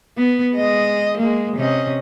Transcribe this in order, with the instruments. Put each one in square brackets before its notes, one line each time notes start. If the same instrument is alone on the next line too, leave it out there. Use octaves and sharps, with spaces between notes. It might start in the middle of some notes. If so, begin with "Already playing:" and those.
[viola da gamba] B3
G#3 D#5
G#3 A#3
C3 C#4 D#5